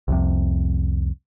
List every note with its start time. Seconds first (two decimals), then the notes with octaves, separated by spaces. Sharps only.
0.08 C2 F2 C3